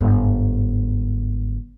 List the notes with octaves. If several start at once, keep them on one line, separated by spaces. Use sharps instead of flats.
G1 G#2